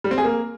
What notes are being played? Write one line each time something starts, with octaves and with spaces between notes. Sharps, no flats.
G3
C4
G#4
A#3